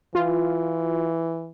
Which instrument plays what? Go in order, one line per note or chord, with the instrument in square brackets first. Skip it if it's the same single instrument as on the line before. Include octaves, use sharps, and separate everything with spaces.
[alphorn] E3 [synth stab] F4